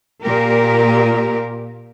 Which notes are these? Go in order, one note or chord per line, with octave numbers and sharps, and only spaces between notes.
A#2 G4 A#4